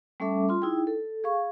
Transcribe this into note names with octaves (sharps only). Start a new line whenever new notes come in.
G3 A3 C#4 A4 E5 D6
F4 C6
D#4 E4 G#4 G5
A4
G#4 F5 C#6